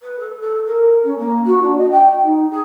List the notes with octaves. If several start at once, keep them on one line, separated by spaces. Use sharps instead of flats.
B4
A4
A4
A#4
C#4
A#3
F#4
D4
D#5
G5
D#4
G#4